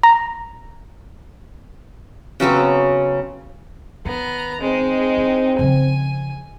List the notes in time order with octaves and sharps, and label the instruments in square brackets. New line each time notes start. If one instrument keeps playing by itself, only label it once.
[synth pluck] A#5
[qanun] C#3 F#3 B3 C4
[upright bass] D#3 [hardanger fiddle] B3 A#5
[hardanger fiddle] G#3 D#4 [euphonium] C4
[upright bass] E4
[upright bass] C#3 F3 [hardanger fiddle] G#5